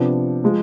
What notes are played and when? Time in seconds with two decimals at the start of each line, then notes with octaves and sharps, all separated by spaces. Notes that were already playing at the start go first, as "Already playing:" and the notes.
Already playing: C3 F3 B3 D4
0.44 F3 G#3